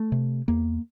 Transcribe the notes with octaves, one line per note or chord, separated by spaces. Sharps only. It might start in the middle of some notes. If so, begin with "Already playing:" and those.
Already playing: A3
C3
E2 A#3